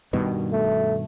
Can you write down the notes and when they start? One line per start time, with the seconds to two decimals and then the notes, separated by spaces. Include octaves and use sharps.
0.13 G2 B2 D#3
0.52 A3